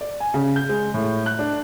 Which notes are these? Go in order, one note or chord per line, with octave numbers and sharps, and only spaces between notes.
D5
G#5
C#3
G6
G#3
A2
F#6
D4